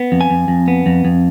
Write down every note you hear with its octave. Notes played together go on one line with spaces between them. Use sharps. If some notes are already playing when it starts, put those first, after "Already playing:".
Already playing: B3
F2
G#5
F2
F2
B3
F2
F2